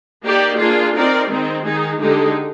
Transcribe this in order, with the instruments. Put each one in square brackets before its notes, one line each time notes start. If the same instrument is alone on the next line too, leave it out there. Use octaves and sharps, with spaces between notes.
[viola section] A#3 D#4 G4 D5
A#3 D4 F4 G#4
C4 D#4 A#4 D5
D#3 G#3 C4 D#4
D#3 G#3 D#4 G#4
D3 G#3 D#4 G4